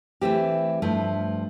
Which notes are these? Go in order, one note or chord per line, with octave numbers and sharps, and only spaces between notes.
E3 A3 C4 G4
G2 F3 A3